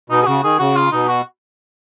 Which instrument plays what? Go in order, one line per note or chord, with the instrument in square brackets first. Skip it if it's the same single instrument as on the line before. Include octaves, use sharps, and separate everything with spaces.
[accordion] B2 [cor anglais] D#4
[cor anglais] G#4
[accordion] C#3 [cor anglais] F#4
[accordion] D#3 [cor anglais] G#4
[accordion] C#3 [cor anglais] F#4
[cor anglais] F4
[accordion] B2 [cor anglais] D#4
[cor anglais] F#4